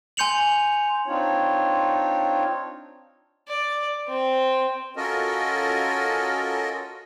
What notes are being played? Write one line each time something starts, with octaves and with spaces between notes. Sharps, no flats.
G#5 C6 G6 C#7 F7 F#7
C4 D4 D#4 F4 C#5
D5
C4
C#4 F4 F#4 A4 A#4 D#5